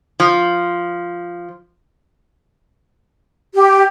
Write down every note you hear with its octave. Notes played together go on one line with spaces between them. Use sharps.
F3
G4